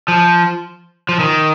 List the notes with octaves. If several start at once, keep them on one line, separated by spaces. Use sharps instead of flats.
F3
F3
D#3